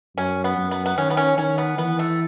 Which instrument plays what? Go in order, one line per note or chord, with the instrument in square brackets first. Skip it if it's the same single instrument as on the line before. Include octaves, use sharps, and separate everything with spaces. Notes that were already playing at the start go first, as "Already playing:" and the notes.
[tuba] F#2 [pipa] C#4
[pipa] B3
[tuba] F#2
[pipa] B3
B3
[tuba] D#3 [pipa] C#4
[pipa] B3
C#4
[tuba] D#3 [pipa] C#4
[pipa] B3
[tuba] E3 [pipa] B3
[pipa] A3